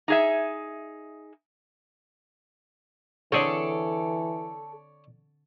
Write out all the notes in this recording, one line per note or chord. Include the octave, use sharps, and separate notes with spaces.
D#4 G#4 E5
D3 E3 C4 G#4 A4 C#5 D5